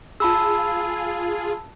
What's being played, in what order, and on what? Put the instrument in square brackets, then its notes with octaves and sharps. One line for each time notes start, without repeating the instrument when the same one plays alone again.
[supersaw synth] F4 G#4 [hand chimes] A5 B5 E6